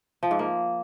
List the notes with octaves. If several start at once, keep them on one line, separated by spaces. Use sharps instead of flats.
F3
G#2
A#3